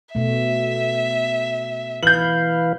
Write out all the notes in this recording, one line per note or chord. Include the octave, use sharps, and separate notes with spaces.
B2 A3 E5
E3 B4 F5 G6 F#7